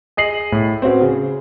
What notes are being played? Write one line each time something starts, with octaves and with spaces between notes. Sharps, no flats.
G#4 D#5 C7 F#7
A2
C4 C#4 F#4 B4
C#3